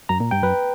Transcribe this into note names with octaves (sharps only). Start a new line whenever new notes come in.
F#2 A#5
A#2
G2 G5
F#2 B4